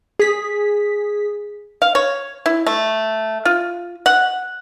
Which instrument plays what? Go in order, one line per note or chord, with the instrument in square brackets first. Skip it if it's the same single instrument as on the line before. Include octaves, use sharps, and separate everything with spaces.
[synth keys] G#4 B6
[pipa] F5
C#5
E4
A3
F4
F#5